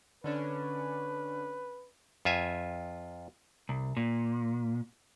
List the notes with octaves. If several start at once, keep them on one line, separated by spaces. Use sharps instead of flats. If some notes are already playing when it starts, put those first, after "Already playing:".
D3 C#4 D4 B4
F2 F4 E5 G#5
C2
A#2